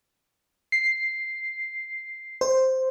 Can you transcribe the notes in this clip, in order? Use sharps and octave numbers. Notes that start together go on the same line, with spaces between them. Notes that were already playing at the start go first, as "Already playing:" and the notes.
C7
C5